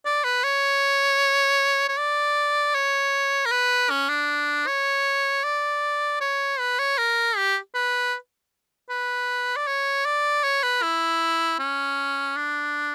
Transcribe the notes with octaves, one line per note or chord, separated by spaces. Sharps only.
D5
B4
C#5
C#5
D5
C#5
A#4
B4
C#4
D4
C#5
D5
C#5
B4
C#5
A#4
G4
B4
B4
D5
C#5
D5
C#5
B4
E4
C#4
D4